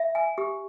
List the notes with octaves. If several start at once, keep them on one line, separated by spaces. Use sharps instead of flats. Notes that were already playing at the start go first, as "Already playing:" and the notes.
Already playing: E5
G#5
G4